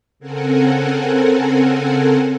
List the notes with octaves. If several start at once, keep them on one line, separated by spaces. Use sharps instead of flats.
C#3 C4 A4 A#4 F#5 G#5